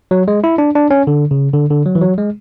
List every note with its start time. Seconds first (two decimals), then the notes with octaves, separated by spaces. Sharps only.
0.11 F#3
0.28 G#3
0.44 E4
0.58 D4
0.75 D4
0.91 C#4
1.07 D3
1.31 C#3
1.54 D3
1.71 D3
1.86 F#3
1.95 E3
2.02 F#3
2.18 G#3